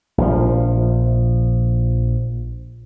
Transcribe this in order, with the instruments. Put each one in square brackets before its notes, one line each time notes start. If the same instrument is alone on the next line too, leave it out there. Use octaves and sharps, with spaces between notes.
[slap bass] A#1 F3